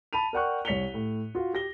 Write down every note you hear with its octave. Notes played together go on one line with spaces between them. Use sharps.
A5 B5 D#7 F7
A#4 D5 F#5 G5 C#6 F#6
C2 C#5 B6 C#7 F7 G7
A2
F4 F#4
G4 A#6 G7